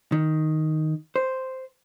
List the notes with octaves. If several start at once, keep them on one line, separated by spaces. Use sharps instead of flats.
D#3
C5